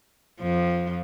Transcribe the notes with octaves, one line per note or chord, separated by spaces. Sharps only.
F2 F3